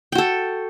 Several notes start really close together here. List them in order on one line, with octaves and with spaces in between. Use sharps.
G5 F#4 A4